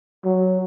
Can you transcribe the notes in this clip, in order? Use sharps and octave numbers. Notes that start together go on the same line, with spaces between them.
F#3